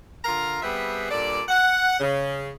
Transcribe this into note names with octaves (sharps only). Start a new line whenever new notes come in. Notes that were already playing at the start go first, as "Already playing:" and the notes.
D3 F4 A#4 F5 A#5
G3 B3 C4 G#4 B4 E5
G2 A#2 A4 D5
F#5
C#3